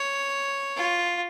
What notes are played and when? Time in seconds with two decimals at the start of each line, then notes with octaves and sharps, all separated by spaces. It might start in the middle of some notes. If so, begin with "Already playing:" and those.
Already playing: C#5
0.76 F4